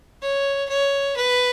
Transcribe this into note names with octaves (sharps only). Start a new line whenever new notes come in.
C#5
C#5
B4